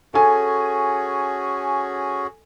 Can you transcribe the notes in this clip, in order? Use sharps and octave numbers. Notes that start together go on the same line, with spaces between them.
C#4 F#4 G#4 A4 G#5